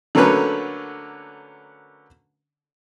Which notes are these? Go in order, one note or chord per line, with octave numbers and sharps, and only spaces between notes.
D3 F#3 A3 A#3 C#4 B4